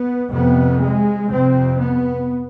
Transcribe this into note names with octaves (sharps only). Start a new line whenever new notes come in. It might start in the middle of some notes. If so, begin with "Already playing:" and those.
Already playing: B3
F2 C3 B3
G#3
F2 C3 C4
B3